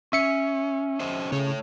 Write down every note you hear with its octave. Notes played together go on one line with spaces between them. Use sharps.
C#4 E5 C#7
C#4 C5 D#5
C#3 A3 C#5